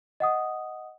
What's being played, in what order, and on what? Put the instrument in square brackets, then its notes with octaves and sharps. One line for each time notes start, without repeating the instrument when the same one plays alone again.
[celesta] D#5 F#5 D#6